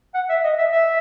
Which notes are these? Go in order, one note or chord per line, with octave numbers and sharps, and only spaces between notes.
F#5
E5
D#5
E5
E5